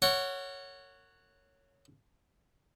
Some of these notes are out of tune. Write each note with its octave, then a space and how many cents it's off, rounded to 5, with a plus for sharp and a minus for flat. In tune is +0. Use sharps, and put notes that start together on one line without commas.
A#4 -40 C#5 +0 F#5 +0